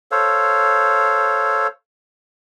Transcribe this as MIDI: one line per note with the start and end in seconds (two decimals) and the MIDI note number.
0.11 1.67 69
0.11 1.67 72
0.11 1.67 73
0.11 1.67 77